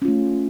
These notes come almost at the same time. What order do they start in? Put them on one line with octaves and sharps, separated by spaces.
C#4 F4 A3